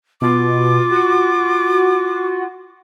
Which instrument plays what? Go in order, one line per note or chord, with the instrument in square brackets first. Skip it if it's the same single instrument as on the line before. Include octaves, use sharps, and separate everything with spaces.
[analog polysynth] B2 [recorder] F4 [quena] D6
[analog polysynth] F#4